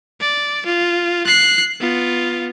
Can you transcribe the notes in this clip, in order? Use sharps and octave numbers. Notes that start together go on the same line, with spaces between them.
D5
F4
F#6 C7
B3 F4